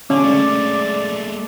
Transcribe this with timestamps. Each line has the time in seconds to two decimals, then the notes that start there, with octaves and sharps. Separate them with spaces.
0.10 D3 C#4 D6
0.24 G#3 A3 D5